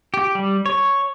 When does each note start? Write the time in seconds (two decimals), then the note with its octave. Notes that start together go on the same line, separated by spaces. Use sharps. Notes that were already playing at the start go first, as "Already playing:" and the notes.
0.14 G4
0.35 G3
0.66 C#5